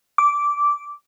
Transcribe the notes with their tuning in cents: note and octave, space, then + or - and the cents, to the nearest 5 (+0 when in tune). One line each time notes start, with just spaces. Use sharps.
D6 -10